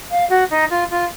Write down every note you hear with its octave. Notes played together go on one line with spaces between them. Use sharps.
F5
F#4
D#4
F4
F4